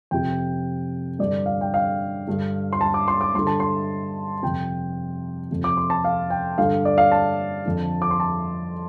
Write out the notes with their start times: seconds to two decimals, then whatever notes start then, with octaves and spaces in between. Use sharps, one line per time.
0.11 F2 C3 G5
1.19 G2 D3 D5
1.46 F5
1.61 G5
1.74 F5
2.27 G2 D3
2.73 C6
2.81 A5
2.94 D6
3.08 C6
3.21 D6
3.34 G2 D3 C6
3.47 A5
3.60 C6
4.43 F2 C3 G5
5.51 F2 C3
5.64 D6
5.77 C6
5.90 A5
6.04 F5
6.30 G5
6.58 G2 D3 F5
6.85 D5
6.98 F5
7.12 A5
7.65 F2 D3
8.02 D6
8.11 C6
8.20 A5